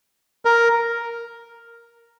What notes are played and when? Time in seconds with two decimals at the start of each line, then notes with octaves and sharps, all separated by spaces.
0.45 A#4